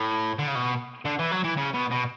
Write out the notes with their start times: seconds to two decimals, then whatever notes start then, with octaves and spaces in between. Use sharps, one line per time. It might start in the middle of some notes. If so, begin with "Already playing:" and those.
Already playing: A2
0.39 D3
0.47 C#3
0.55 B2
1.05 D3
1.19 E3
1.32 F#3
1.44 E3
1.57 C#3
1.74 B2
1.91 B2